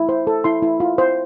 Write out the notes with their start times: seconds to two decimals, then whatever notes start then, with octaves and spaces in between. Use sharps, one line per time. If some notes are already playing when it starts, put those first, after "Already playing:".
Already playing: E4
0.09 C5
0.27 A4
0.44 E4 C6
0.62 E4
0.80 F4
0.98 C5